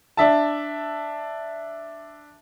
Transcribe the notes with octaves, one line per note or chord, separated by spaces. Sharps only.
D4 E5 A5